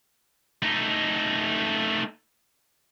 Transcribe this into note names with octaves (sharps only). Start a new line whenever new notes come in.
A3 D#4